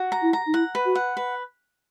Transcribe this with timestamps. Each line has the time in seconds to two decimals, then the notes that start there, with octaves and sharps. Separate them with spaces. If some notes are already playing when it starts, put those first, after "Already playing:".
Already playing: F#4
0.12 A#5
0.22 E4
0.33 A#5
0.47 D#4
0.54 E4 F#5
0.75 B4
0.86 F#4
0.95 F#5
1.17 B4